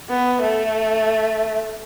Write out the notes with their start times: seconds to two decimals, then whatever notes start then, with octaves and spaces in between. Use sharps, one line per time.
0.09 B3
0.41 A3